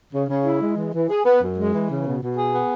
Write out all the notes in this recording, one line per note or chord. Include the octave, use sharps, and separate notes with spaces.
C#3
C#3
E4
G#3
E3
E3
G#4
B3
F#2
G#3
E3
C#3
B2
B2
G#4
B3